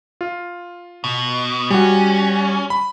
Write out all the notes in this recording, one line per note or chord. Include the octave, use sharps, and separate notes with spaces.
F4
B2
G3 C#4 F#4
B5